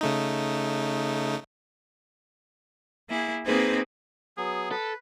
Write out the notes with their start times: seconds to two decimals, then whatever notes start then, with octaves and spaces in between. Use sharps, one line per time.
0.01 C#3 A3 D#4
3.09 A#3 E4 G#4
3.45 A#3 C4 D#4 G#4 B4 C5
4.38 F#3 B3 G#4
4.71 A4 B4